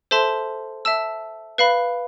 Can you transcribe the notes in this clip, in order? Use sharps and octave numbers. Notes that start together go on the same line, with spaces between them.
A4 C5 E5 A5 C6
E5 A5 E6
B4 F5 B5